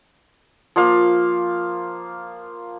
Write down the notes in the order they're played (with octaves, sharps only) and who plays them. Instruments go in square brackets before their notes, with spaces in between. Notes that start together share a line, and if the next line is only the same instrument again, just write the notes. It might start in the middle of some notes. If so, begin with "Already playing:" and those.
[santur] F3 A#3 F5